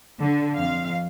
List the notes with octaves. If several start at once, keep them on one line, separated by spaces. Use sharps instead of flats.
D3
F2 F5